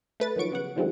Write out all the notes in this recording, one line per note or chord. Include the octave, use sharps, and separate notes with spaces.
A3 B4 A6
D#3 F3 F#3 C#6 D7
C#3 B3 F#5
D3 D#3 F3 G3 G#3 C4